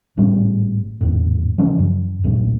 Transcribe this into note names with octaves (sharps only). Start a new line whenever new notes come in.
G#1 A2 G3 C#4
G#1 E2 A2
C#3 E3 F3 C#4
F#2
D#1 B1 A#2 A3